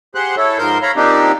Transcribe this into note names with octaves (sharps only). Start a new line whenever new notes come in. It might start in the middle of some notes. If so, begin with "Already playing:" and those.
G4 G#4 C5 F#5 C6 F#6
E4 A4 C#5
G#2 F3 A#4 C5 C6 G6
C#5 F5 A#5 B5
F3 A#3 C4 D4 D#4 G4